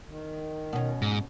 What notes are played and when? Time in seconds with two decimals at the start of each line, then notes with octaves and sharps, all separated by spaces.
0.07 D#3
0.73 B2 C#4
1.02 G#2